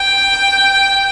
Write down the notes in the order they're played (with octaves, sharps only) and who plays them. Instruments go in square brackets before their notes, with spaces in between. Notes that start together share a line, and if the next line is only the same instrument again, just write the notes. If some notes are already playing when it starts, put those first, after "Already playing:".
Already playing: [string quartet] G5